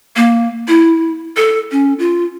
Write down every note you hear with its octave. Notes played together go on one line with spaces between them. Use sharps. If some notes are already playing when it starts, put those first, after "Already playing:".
A#3
E4
A4
C#4
F4